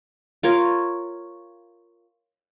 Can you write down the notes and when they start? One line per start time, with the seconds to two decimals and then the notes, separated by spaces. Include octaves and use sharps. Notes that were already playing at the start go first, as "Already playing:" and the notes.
0.43 F4 A#4 C#5